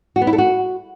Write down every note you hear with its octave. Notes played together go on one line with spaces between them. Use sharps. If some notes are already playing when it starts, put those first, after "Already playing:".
F#4
B3
E4
A4
F#4